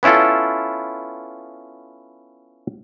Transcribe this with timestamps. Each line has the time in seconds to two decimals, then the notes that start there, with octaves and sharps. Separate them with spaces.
0.03 B3 C#4 E4 F4 A4